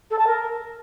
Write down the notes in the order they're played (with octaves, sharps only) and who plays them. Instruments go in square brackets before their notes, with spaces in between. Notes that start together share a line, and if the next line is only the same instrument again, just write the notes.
[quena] A4
A5
A#4